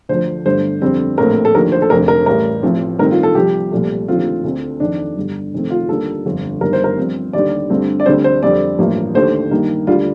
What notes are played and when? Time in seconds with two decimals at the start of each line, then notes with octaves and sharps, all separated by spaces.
0.09 D2 D3 F3 C5
0.45 G1 G2 D3 A3 C5
0.82 F2 D3 G3 C4
1.17 A#1 A2 A3 C4 A#4
1.45 A4
1.54 D#2 D3 F3 A3 A#4
1.72 C5
1.82 A4
1.90 F1 F2 D3 A#4
2.08 A#4
2.26 A1 A2 G3 A#4
2.63 A1 A2 F3 C4
2.99 G2 D#3 A3 C4 A#4
3.11 F4
3.23 A4
3.35 C2 C3 F3 G4
3.72 C2 A#2 F3 A3
4.08 D#2 D3 F3 A3 C4 F4
4.44 D2 D3 A3 C4
4.80 F2 D#3 A3 D4
5.16 G1 G2 D3
5.53 F1 F2 D#3 A3 C4
5.70 F4
5.88 D#2 D3 G3 A#3 A4
6.25 G1 F2 D3
6.61 G1 G2 D#3 A#4
6.73 C5
6.84 A#4
6.98 G2 F3 C4
7.33 D#2 D3 G3 D5
7.70 G2 D3 A3 C4
8.00 D5
8.06 D2 D3 G3 C4 C5
8.24 C5
8.42 F2 D3 G3 C4 D5
8.79 A1 G2 F3 A#3
9.15 D#2 D3 A3 C5
9.51 G2 D#3 A#3
9.87 D2 D3 G3 F4